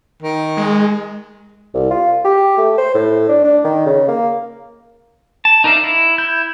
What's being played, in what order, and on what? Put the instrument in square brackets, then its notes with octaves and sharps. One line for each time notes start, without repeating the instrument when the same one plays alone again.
[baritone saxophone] D#3
[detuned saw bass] G#3
[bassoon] C2
F4
G4
A3
C5
A2
D4
D4
D#3
C#3
A#3
[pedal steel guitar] A5
D#4 A#4 D5 E5 F5
E4
E4 G6